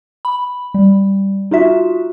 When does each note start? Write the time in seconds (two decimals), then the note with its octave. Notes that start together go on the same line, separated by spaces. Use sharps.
0.25 B5
0.74 G3
1.51 D#4 F4 F#4 E5